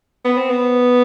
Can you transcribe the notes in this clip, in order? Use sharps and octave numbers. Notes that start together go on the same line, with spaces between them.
B3
C4
B3